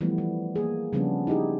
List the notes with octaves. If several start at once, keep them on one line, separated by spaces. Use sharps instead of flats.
E3 F3 G3 A3 B3
E3
A#3 G#4
C#3 F3 G3 B3 C#4 D4
D#4 E4 G4 G#4